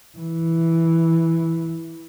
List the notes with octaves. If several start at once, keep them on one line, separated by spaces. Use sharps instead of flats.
E3